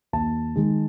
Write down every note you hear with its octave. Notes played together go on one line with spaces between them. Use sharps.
D#2 A5
D#3 G#3